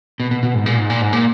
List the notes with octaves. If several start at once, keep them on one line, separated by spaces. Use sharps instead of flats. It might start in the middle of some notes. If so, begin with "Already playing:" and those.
B2
B2
B2
G#2
A#2
G#2
A#2
G#2
A#2